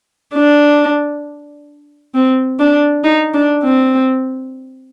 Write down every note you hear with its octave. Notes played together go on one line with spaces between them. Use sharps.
D4
C4
D4
D#4
D4
C4